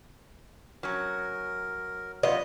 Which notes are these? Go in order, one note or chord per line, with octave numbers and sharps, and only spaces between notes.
F#3 C#4 A#4
F#2 B3 F4 D#5